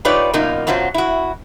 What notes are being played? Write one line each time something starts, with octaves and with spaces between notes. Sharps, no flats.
D#4 F4 G4 B4 C#5 D5
F#2 B2 A#3 D#4 F4
F#2 B2 F#3 F4 C5
E4 F#4